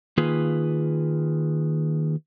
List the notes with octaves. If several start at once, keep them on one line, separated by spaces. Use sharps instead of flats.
D#3 A#3 F4 G#4 B4